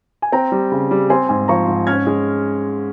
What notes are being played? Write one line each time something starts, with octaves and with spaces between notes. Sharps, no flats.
G#5
C4 G5 A#5
G3
C#3
G3
C4 G#5 C6
G#2 G#5 C6
F3 A#5 C#6
G#2
C#4 F6 G#6
G#3